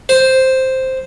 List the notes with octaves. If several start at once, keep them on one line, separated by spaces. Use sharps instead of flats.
C5